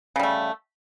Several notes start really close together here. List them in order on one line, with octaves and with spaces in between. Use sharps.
C#3 G3 A3